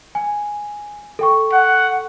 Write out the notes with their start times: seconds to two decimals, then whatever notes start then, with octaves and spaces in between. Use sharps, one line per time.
0.15 G#5
1.19 A4 G5 C#6
1.52 F#5